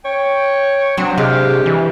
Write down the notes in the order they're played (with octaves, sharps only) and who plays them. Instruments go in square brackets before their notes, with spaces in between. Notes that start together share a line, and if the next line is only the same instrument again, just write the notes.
[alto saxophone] C#5 [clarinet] G5
[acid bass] F#3 [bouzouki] C4 C5 [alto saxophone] D4
[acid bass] C3 [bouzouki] G#3 F5 [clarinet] G4
[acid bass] E3